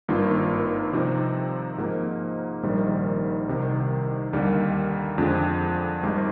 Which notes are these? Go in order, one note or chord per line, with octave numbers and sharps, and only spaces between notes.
G#1 G2 D#3 A#3 F4
C3 F3 C4 D#4
G#2 F3 A#3 D#4
A#1 G#2 D#3 G3
C2 C3 D#3
D#2 D3 G3 A#3 D#4
F2 D3 F3 G#3 D4
G#1 G#2 G3